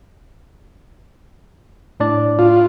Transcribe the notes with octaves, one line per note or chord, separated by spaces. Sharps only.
A2 D4 D5
F4